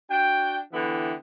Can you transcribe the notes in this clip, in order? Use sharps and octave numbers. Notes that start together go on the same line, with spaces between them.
D4 F#4 G5
D3 E3 B3 E4 G5